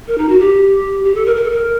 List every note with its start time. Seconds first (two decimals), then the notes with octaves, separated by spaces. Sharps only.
0.07 A#4
0.18 D#4
0.29 F#4
0.40 G4
1.04 G4
1.15 A4
1.26 A#4
1.36 A#4
1.44 A4
1.51 A#4